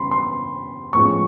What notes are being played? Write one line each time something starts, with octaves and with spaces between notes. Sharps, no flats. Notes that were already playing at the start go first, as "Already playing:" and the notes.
Already playing: C#3 E3 G3 B5 C6
C6
A2 F3 G#3 C#4 C#6